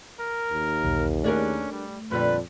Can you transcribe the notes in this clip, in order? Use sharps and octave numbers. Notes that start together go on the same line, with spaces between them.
A#4
D#2
B1 E2
A3 C#4 D4 G#4 A#4
G3
F2 A#2 D3 G3 B4